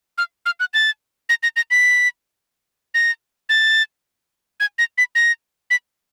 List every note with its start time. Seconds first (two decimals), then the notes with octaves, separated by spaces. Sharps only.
0.18 F6
0.46 F6
0.60 F#6
0.74 A6
1.29 A#6
1.43 A#6
1.56 A#6
1.71 B6
2.94 A#6
3.49 A6
4.60 G#6
4.78 A#6
4.98 B6
5.15 A#6
5.70 B6